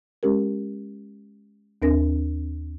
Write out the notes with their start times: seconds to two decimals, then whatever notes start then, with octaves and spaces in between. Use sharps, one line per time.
0.23 G#3 C#4 G4 A#4
1.82 D#2 C4 D4 A#4 A#6